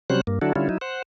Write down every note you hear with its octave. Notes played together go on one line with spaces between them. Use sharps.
C3 F#3 G3 C#4 C5 F#6
G2 A#3
D3 F#3 D4 E4 F#4 A4
D3 G3 C#4 E4 F4
F#3 D#4 E4
C5 F#5